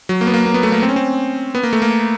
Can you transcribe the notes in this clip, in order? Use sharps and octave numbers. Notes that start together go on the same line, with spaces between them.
F#3
A#3
B3
A#3
A#3
B3
A3
A#3
C4
C#4
C4
B3
A#3
A3
A#3